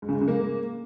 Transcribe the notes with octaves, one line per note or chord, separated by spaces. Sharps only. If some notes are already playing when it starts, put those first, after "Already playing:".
G#2
C#3
G#2
C#3
A#3